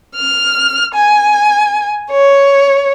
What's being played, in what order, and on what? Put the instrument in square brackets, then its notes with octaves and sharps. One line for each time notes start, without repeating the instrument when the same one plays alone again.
[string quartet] F6
G#5
C#5